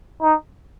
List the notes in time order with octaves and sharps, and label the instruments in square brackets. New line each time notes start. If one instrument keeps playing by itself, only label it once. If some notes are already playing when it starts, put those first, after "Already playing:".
[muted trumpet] D#4